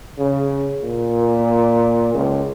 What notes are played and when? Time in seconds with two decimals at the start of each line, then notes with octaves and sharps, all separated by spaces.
0.18 C#3
0.82 A#2
2.15 C#2